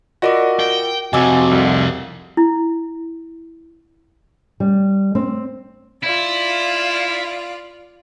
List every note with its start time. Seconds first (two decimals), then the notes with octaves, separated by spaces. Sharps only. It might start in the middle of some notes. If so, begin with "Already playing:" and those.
0.22 F4 F#4 A#4 D5 D#5 D6
0.59 G5
1.13 F2 C3 F#4 D#5 G#5 D6 E6
1.51 C2
2.37 E4
4.60 G3
5.15 C4
6.03 E4 F4 D5